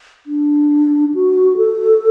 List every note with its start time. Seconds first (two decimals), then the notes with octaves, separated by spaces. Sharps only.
0.27 D4
1.14 F#4
1.57 A4